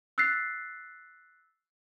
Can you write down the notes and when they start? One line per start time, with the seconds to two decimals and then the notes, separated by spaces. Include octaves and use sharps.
0.18 E6 F#6 A6 B6 C7